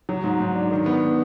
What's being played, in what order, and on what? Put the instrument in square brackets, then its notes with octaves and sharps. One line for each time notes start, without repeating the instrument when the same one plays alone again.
[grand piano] F#3
G#2
G#2
D4
D#3
B3